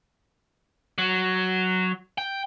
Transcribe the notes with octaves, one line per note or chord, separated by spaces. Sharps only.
F#3
G5